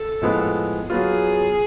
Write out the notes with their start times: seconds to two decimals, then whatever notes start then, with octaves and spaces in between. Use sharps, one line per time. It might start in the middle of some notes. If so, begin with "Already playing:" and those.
Already playing: A4
0.21 A2 F3 G#3 B3
0.90 F#3 B3 F4 G#4